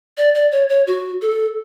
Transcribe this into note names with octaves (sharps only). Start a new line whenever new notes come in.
D5
D5
C#5
C#5
F#4
A4